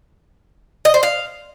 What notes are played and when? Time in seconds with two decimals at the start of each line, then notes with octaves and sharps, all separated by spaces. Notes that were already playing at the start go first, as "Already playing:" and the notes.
0.85 D#5
0.94 C5
1.03 F5